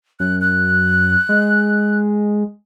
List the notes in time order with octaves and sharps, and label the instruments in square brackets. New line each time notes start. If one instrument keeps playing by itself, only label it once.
[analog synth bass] F#2 [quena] F#6
[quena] F#6
[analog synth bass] G#3